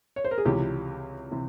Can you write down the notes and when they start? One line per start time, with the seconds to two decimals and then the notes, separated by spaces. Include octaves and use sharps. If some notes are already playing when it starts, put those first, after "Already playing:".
0.16 C#5
0.25 C5
0.31 A#4
0.38 G#4
0.45 C#2 C3 E3 G4
1.31 C3 E3